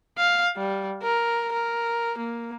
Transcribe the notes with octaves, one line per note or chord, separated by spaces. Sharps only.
F5
G3
A#4
A#4
A#3